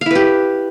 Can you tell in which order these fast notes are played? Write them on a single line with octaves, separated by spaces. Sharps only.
F5 E4 B4 G4